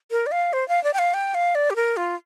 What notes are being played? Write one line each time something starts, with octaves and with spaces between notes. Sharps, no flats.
A#4
D5
F5
C5
F5
D5
G5
F5
G5
F5
D5
G4
A#4
F4